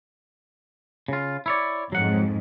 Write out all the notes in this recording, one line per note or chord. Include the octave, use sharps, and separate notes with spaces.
C#3 F4
E4 C#5 D5
F2 G#2 F#3 F#5